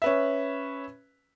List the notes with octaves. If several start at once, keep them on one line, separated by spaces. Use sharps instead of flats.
C#4 B4 E5